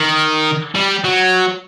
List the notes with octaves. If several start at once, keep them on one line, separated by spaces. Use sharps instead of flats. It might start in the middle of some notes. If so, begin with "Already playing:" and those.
Already playing: D#3
G3
F#3